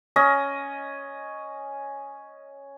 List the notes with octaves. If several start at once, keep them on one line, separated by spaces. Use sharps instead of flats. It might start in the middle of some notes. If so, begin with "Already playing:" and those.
C#4 D#5